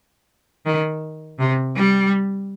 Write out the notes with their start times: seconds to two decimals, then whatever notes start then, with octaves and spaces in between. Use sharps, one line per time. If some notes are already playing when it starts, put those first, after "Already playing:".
0.66 D#3
1.39 C3
1.76 G3